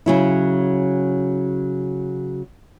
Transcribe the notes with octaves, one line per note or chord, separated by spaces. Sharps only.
C#3 F#3 E4